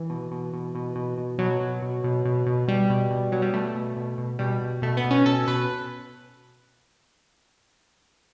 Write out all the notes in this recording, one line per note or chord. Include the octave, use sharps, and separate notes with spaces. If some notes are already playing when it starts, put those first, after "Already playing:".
Already playing: E3
B2
B2
B2
B2
B2
B2
B2 F#3
B2
B2
B2
B2
B2
B2 G3
B2
B2
B2 F#3
G3
B2 A3
B2
B2
B2
B2 G3
B2
B2 A3
B3
B2
C#4
B2 A4
B2 B4